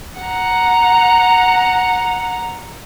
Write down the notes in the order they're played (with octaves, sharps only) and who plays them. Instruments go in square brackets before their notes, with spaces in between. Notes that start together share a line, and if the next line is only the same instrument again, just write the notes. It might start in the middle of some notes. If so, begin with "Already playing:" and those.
[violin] F#5 A#5